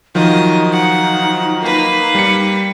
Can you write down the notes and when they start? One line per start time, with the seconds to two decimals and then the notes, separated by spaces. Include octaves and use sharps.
0.15 D#3 F3 F#3 D#4 D#5
0.72 F#5
1.61 A#3 B4
2.15 G3 C#7